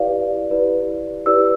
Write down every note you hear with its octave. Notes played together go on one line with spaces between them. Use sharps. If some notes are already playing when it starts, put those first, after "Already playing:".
Already playing: E4 G4 B4 D5 F5
E4 G4 B4 D5
E4 G4 B4 D5 E6